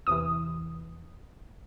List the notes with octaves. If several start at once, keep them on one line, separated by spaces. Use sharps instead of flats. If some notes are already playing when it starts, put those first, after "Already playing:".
E2 C3 E3 D#6